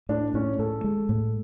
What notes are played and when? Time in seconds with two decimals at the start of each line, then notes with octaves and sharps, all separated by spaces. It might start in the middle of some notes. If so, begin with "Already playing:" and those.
0.09 A2 D4
0.34 A2 C#4
0.59 A2 A4
0.84 G#3
1.09 A2